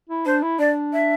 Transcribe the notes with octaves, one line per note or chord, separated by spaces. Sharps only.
E4
D4 C5
E4
D4 D5
E5